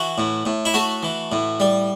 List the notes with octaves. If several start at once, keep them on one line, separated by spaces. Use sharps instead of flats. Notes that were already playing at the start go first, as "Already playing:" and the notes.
Already playing: E3 F#4
A2
A2
E4
A3 F#4
E3
A2
G3